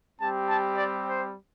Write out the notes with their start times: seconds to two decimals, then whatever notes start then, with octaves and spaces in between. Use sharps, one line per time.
0.20 G3 C4 G4 A5
0.49 A5
0.77 D5
1.06 C5